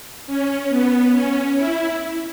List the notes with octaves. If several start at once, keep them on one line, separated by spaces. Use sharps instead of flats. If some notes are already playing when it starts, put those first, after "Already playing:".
C#4
B3
C#4
E4